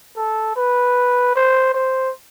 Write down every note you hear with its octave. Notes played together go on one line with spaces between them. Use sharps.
A4
B4
C5
C5